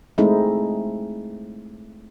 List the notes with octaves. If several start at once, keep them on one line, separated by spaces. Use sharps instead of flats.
G#3 A3 C4 D#4 E4